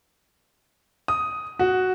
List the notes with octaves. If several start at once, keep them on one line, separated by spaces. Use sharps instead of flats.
D#6
F#4